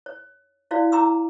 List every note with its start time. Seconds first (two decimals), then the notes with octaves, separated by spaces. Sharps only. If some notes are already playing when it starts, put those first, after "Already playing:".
0.06 C#5
0.71 E4 F#4 C#5 D5 F5
0.92 E4 G5 A#5 C6 D6 E6